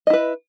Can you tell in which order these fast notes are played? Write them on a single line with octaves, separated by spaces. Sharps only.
D#5 E4 B4